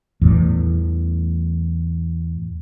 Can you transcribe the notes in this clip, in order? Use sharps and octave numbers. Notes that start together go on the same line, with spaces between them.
E2 A2 E3